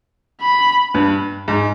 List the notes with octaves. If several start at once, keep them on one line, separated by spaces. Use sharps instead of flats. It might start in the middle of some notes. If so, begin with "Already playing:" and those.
B5
G2
G#2